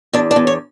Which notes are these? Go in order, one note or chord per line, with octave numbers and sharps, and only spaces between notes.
E2 D4
D4
E2
C#5